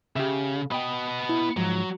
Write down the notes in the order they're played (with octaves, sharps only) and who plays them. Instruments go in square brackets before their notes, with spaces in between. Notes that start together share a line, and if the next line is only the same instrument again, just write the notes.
[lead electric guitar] C#3 [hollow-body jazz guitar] G4 E5
[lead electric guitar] B3 D#5 [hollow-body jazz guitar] G5 B5
[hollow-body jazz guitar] E4
[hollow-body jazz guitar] G#2 F3 [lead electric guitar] F#3